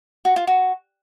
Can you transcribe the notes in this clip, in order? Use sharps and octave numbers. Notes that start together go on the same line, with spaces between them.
F#4
F4
F#4